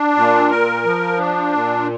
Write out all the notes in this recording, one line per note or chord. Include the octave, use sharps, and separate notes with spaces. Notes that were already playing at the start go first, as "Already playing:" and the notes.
Already playing: D4
A#2
A#4
F3
D4
A#2